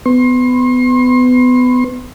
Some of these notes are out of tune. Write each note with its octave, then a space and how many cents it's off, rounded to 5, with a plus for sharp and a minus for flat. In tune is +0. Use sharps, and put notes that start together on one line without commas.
B3 +25 C6 +35